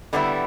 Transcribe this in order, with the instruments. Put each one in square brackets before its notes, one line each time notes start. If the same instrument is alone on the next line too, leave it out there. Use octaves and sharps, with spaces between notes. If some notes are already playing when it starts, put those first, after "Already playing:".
[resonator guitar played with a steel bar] D3 G3 B3 E4